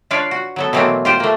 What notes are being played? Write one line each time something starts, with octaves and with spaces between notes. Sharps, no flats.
D4 F4 B4 C#5 F5
F#4
F#3 B3 A4
B2 E3 F#3 A3 A#3 C4
F4 G4 C5
A3 A#3